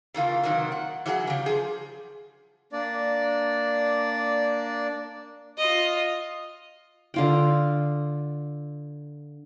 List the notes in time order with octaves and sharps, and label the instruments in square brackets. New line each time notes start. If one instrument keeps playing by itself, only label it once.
[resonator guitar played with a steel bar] C#3 E3 A#3 F4
C3 D#3 F#3 A#3
F#5
E3 F#3 G#4 E5 F#5
C#3 G3
F3 G#4
[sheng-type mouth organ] A#3 D4 D5
[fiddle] F4 D#5
[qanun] D3 F4 G5